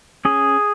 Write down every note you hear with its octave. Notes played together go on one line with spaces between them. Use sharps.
C#4 G#4